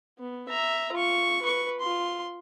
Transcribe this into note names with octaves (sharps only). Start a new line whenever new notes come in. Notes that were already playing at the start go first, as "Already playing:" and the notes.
B3
E5 A#5
F4 C#6
B4 C#6
F4 C6